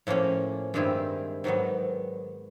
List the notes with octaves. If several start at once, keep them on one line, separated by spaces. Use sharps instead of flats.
A2 F3 A#3 C#4
G2 D#3 G#3 C4 E4
G#2 D#3 F#3 B3